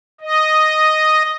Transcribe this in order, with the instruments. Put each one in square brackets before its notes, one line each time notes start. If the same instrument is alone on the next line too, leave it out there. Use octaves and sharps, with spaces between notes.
[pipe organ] D#5